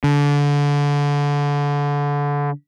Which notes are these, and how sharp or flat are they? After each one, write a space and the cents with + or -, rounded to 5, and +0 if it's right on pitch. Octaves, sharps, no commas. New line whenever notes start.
D3 -25